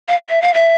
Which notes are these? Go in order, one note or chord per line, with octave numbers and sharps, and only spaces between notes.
F5
E5
F5
E5